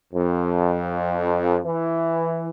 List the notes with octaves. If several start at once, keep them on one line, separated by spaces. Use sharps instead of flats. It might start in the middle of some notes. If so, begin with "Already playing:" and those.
F2
E3